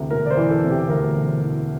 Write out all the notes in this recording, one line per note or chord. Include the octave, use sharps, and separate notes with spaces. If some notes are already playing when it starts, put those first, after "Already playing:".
Already playing: D2 C3 E3
E1 A#4
D5
C5
E3
A4
C3
G4
D2 A#4
E1
E3